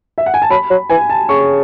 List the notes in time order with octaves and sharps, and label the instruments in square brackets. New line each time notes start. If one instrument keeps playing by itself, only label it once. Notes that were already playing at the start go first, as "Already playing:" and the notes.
[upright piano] E5
F#5
G#5
A5
[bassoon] F#3 [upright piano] B5
[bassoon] F#3
[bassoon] E3 [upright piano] G#5
[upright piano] A5
[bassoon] C#3 [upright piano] C#6